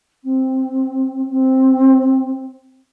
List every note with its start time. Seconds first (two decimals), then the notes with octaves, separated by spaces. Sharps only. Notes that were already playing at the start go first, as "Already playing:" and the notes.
0.23 C4
1.29 C4